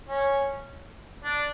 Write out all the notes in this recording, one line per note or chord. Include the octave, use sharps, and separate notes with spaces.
C#4
D4